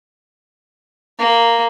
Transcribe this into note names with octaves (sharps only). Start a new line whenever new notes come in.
A#3